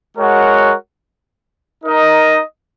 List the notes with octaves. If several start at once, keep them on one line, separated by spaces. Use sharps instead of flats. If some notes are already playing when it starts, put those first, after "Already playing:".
G#3 F#4 A#4 C#5 F#5
D#4 A#4 D#5